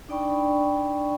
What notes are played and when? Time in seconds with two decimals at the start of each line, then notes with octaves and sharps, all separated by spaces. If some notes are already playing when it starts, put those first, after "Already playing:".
0.09 D4 D#4 D5 G5 B5 C#6